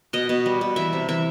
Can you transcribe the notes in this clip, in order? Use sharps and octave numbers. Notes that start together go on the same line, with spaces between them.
B2 D#5
B2
G3
B2
E3 E5
C3
E3 E5